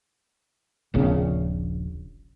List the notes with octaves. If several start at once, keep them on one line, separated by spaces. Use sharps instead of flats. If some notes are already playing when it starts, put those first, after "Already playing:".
D#1 A#1 C#3 C4